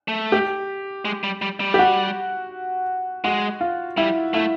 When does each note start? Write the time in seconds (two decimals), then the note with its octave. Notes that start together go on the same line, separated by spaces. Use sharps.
0.08 A3
0.32 G4
1.05 G#3
1.24 G3
1.42 G3
1.60 G3
1.74 G4
1.79 F#4
3.24 G#3 F#4
3.61 F4
3.97 G3 E4
4.34 A3 E4